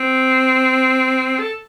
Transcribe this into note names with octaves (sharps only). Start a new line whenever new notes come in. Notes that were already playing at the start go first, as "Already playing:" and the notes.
Already playing: C4
A4